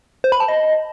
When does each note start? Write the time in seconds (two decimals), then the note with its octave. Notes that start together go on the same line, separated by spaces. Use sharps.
0.24 C5
0.32 B5
0.40 A5
0.48 D#5